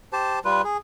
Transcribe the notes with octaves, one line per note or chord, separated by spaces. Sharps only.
G4 C5 A5
G3 F4 B4
G#4